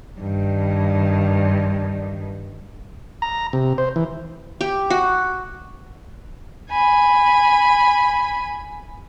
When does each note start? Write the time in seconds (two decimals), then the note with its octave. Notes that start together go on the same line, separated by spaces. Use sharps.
0.20 G2 D#3
3.22 A#5
3.53 C3
3.78 C5
3.96 E3
4.61 G4
4.90 F#4
6.71 G#5 B5